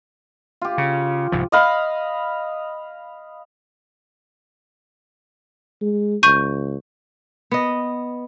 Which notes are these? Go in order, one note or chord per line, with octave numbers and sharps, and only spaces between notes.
F4 G4
C#3
C2 G#2 F3
D#5 F5 B5
G#3
C#2 C#6 G6 D#7
B3 D#5